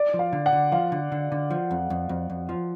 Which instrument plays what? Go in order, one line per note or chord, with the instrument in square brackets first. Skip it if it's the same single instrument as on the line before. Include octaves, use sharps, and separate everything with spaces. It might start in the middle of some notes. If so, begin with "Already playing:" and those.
Already playing: [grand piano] D5
[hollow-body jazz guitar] F3
[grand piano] F5
[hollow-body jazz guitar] D3
[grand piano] F#5
[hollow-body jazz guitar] D3
[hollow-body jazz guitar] F3 [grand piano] F5
[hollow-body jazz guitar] D3
D3
D3
F3
F2
F2
F2
F2
F3